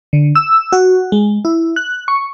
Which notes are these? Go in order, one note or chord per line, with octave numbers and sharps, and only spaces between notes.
D3
E6
F#4
G#3
E4
F#6
C#6